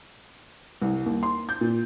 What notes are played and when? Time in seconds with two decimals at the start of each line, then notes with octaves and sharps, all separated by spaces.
0.82 C2
1.06 D#2
1.23 C6
1.49 G6
1.61 A#2